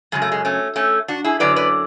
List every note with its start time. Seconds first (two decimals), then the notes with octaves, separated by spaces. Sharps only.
0.12 F#2 C#3 F#3 G#3
0.22 A3
0.32 G#3
0.45 A3 C#4
0.76 A3 C#4
1.08 D4 F#4
1.24 E4 G#4
1.40 F#2 D3 F#3 B4 D5
1.56 B4 D5